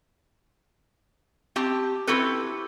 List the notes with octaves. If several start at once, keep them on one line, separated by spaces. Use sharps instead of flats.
C4 G4 A5
C4 E4 F#4 G4 A4 B4